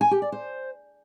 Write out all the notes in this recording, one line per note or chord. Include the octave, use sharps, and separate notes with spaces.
G#5
G4
D5
C5